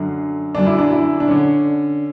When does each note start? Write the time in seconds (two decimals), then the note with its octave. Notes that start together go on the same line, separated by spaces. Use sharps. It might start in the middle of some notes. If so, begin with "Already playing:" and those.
Already playing: F#2 D3
0.55 F#2 D3 D4
0.67 E4
0.79 D4
0.92 E4
1.20 D4
1.28 D3 C#4